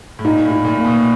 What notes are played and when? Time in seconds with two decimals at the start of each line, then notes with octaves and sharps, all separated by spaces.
0.19 A2
0.25 A#2 D#4
0.45 A2
0.51 D#4
0.65 A#2
0.78 A#3
0.85 B2